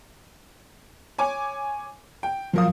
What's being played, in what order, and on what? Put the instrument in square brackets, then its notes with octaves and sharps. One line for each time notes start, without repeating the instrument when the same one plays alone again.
[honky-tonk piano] C#5 G#5 D6
G5
[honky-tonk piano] A#2 A#4 D#6 [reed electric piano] F3 F#3 F5